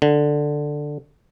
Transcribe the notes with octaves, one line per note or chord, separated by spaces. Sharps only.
D3